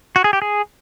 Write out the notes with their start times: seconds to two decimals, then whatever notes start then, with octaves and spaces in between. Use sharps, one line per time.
0.16 F#4
0.24 G#4
0.33 G4
0.42 G#4